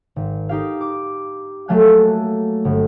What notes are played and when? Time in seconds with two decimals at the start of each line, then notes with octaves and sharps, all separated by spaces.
0.16 G#1
0.49 D#4 G4 F5
0.81 D6
1.68 F#3 A3 A#3 F5 G#5 F#6
2.65 G1